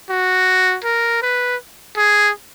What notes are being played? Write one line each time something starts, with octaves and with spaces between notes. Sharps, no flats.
F#4
A#4
B4
G#4